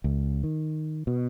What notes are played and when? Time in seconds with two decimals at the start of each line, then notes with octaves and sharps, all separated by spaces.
0.04 C#2
0.43 D#3
1.07 B2